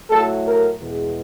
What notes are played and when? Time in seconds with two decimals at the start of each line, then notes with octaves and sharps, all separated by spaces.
0.10 A2 F#3 A3 A4
0.46 A#4
0.81 E2 B2 G#3